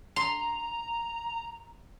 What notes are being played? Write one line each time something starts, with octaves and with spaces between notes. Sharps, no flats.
A#5 C6